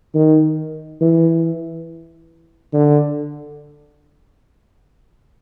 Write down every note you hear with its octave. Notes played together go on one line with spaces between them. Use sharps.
D#3
E3
D3